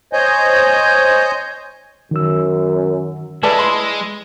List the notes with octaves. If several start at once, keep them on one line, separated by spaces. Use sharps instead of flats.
C5 C#5 D#5 G#5 G6
F#2 D#3 E6
G#3 E4 A4 B4 D5 E5 A5
B5 C6 E6